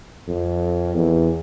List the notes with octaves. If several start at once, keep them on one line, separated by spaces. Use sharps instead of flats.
F2
E2